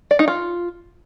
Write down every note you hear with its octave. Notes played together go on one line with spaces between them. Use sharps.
D5
D#4
F4